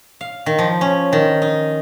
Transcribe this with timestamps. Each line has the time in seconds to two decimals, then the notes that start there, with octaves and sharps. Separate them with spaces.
0.21 F5
0.46 D#3
0.59 F3
0.81 C#4
1.13 D#3
1.42 D#4